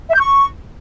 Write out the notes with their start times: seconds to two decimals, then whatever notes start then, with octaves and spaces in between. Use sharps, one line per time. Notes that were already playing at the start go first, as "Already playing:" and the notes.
0.08 E5
0.14 G6
0.19 C#6